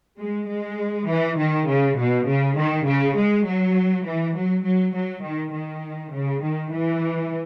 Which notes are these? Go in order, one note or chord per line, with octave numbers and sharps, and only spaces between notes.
G#3
G#3
E3
D#3
C#3
B2
C#3
D#3
C#3
G#3
F#3
E3
F#3
F#3
F#3
D#3
D#3
C#3
D#3
E3